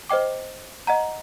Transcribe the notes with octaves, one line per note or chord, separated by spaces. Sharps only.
C5 D#5 G5 D6
D#5 F#5 A#5